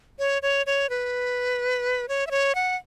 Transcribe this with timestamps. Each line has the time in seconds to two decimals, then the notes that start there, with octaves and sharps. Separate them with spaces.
0.19 C#5
0.42 C#5
0.66 C#5
0.90 B4
2.09 C#5
2.27 E5
2.31 C#5
2.55 F#5